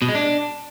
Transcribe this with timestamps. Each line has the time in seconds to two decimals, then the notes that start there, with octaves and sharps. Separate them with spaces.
0.02 B2
0.08 G#3
0.15 D4